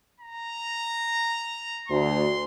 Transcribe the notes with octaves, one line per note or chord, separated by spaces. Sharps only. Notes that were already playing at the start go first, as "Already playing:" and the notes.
A#5
D2 C6